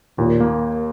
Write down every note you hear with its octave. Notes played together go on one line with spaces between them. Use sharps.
D#2 A#2
A#3